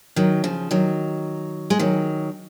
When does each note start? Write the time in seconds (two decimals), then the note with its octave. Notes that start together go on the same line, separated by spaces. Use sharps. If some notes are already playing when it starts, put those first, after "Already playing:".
0.16 D#3 F#3
0.44 C#3 F3
0.71 D#3 F#3
1.70 G#3
1.79 D#3 F#3